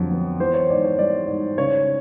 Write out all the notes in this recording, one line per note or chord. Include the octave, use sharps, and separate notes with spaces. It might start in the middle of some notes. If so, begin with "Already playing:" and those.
Already playing: F2 D3 F#3
B3
E3 C5
C#5
G#2 D5
C#5
G3 D5
G#2
C#3 C#5